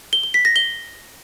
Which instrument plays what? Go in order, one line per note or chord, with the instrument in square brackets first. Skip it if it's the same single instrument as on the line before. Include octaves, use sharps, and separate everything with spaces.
[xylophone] G7
G7
B6
A#6
G7